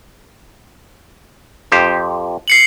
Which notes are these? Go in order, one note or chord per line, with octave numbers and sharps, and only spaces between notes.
F2 G4 C5
C7 C#7 F#7